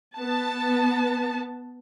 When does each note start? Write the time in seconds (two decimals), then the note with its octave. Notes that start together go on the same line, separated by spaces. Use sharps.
0.18 B3 A5